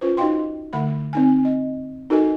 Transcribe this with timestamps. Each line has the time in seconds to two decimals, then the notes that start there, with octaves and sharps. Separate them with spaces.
0.01 C#4 F4 B4 C5
0.17 D#4 F#4 D#5 F5 G5 C6
0.73 D3 A3 F#5 B5
1.13 C4 D#4 G#5
1.45 D#5
2.10 D#4 F#4 A4 A#4 D#5 G#5